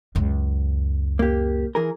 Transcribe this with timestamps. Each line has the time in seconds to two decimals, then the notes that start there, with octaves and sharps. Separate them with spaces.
0.15 C#2 F#2
1.19 A#3 G4
1.75 E3 G#4 A#4